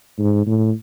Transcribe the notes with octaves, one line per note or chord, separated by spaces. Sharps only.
G#2
A2